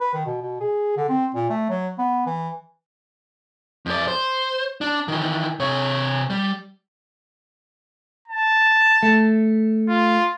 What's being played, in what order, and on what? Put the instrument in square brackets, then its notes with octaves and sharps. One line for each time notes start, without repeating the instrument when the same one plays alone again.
[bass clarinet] B4
D#3
B2
B2
G#4
D3
C4
A#2
A3
F#3
B3
E3
[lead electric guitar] F2 D5
C5
D4
D#3 E3
C3 C#5
G3
[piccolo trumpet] A5
[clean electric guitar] A3
[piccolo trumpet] F4